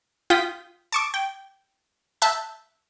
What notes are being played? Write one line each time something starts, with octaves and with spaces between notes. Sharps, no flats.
F4 G5 D#6 B6
A5 C#6 D6
G5
E5 A5 F#6 G6